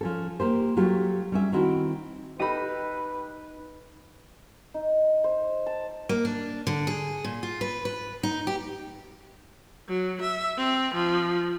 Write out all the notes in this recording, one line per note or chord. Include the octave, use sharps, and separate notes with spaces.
F3 C#4 A4
A#3 G4 C5
F#3 A3 F4 G4
G3 C#4 E5
D#3 C4 E4 F#4
D#4 G4 A4 B4 B5 A#6 D#7
D#4
C5
A5
A#3
D4
D3
G#4
A#2
F4
B4
B4
D#4
G4
F#3
E5
C4
F3